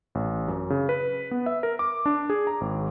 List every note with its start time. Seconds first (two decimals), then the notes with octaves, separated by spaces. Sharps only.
0.15 A1
0.48 F#2
0.70 C#3
0.89 B4
1.31 B3
1.46 E5
1.63 A#4
1.79 D6
2.06 D4
2.30 G#4
2.47 A#5
2.61 G#1